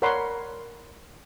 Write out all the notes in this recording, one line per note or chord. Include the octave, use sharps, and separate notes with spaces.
A#4 C#5 D5 F#5 B5 C6